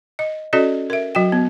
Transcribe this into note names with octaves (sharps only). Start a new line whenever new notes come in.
D#5
C#4 F#4 A4 D5 D#5
A#4 E5
F#3 F#4 G5
B3